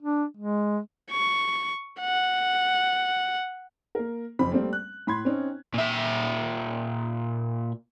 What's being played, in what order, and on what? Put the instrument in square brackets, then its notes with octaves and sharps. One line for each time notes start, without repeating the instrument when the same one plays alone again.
[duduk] D4
G#3
[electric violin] C#6
F#5
[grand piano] A#3 A#4
F#1 F2 C4 B5
G3 A3 A#3 C4
F#6
A2 B5 C6 G#6
C4 C#4 D#4
[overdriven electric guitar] A#2 E5